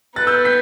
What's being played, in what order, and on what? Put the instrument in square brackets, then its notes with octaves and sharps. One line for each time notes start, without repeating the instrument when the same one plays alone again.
[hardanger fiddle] B3 [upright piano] F#6 A6
[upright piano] E6 G6
G6 B6